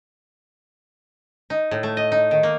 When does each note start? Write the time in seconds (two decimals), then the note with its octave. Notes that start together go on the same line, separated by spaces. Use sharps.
1.50 D#4
1.71 A2
1.83 A3
1.97 D#5
2.12 D#4
2.31 D#3
2.43 A#3